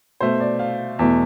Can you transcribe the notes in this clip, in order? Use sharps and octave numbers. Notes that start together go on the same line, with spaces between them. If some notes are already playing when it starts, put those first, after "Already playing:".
B2 A3 C5
D5
F5
E2 B2 A3